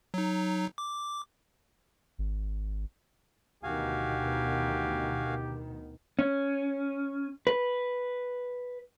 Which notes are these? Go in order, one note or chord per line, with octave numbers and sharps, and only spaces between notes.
F#3 D#4
D6
G#1
D2 B2 D#3 F#4 G4 F5 G#5
C#4
B4